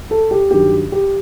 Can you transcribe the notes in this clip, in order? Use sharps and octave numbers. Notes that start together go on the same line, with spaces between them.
A4
G4
G2 D#3 F#3 G4
G4